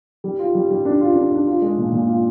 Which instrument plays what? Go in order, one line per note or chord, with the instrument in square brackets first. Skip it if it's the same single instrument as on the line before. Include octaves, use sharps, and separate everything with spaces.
[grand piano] G3
F4
G3
G3
D4
F4
D4
D4
F4
G#3
A#2
A#2
F4